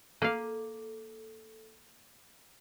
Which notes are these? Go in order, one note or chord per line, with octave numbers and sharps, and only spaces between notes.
A#3 A4 F5